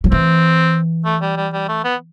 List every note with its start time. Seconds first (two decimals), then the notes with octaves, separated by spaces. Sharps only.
0.04 F3
0.12 E3 C4
1.05 A3
1.22 G3
1.37 G3
1.53 G3
1.69 A3
1.84 B3